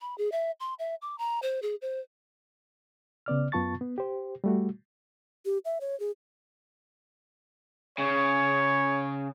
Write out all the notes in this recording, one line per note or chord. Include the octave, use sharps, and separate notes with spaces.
B5
G#4
E5
C6
E5
D6
A#5
C5
G#4
C5
C#3 B3 D5 F6
F#2 B3 F4 A5 C#6 A6
B3
G4 C5
G3 A3 F#4
G4
E5
C#5
G#4
C#3 C#5